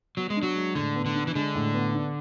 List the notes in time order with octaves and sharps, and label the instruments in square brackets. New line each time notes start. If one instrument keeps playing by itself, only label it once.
[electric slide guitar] F#3 [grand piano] B3
[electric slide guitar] G#3
[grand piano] D4
[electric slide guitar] F#3
[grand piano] G#3
[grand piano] A2 [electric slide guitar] D3
[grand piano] B3
[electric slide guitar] D3
[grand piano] D4
[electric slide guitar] E3
[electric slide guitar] D3 [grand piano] G#3
[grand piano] A2
B3
D4